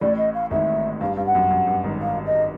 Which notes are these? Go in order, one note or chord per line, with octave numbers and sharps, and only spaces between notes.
A1 A2 D5
D#5
F5
G#1 G#2 E5
G2 F5
G2 F5
F#5
F#2
F#2
G2
G#1 G#2
F5
D#5